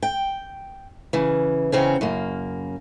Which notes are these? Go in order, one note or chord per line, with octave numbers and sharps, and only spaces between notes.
G5
C#3 E3
E2 C#3 C4 C#4
F#2 C#3 A#3